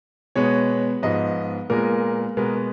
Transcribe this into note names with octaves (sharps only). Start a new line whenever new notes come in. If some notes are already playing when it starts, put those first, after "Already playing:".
B2 G#3 B3 C#5
G#2 F3 B3 D#5
A#2 G#3 B3 A#4
B2 G#3 B3 A#4